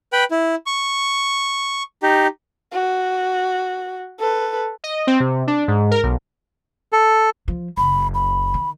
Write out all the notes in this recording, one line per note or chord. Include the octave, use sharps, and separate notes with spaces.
B4 G5 B5
E4
C#6
D#4 G4
F#4
A4 B4
D#5
C4
C3
D4
G#2
A#4
B1
A4
F3
F#1 B5
B5
D#3